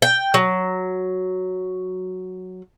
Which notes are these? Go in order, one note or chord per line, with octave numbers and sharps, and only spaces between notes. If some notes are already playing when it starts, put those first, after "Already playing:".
G5
F#3